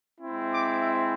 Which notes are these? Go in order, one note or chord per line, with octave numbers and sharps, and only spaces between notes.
G#3 C4 E4
D6
E5